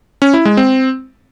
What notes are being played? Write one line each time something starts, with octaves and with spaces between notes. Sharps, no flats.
C#4
E4
G#3
C4